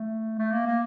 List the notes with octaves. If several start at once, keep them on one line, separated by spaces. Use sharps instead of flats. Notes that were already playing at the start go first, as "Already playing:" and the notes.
Already playing: A3
A3
A#3
A#3